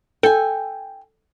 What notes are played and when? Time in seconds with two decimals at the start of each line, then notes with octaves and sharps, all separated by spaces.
0.23 A4 G5 G#5